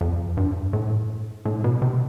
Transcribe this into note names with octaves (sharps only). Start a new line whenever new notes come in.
F2
G2
A2
A2
B2
C3